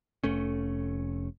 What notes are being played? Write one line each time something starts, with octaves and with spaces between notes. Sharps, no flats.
F1 A3 C#4